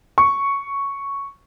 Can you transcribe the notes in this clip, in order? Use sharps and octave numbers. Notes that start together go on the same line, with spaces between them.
C#6